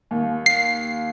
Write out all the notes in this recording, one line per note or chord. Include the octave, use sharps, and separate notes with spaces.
D#2
C7